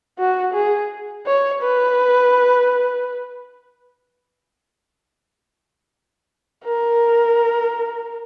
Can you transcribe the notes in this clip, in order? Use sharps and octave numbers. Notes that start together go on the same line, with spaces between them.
F#4
G#4
C#5
B4
A#4